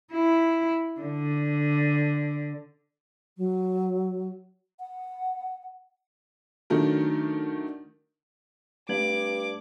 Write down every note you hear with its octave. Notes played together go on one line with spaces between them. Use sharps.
E4
D3
F#3
F#5
D#3 F#3 A3 D4 A#4
G2 A3 D6 G#6 F#7